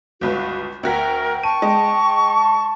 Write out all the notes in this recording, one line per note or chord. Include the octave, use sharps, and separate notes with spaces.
G1 C#2 F#4 B4
D2 F#4 A#4 G5 B6
A5 C#6 D#7
G#3